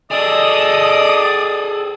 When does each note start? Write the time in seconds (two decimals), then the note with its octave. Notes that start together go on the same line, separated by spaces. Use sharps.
0.11 G#4 A4 D5 D#5 D#6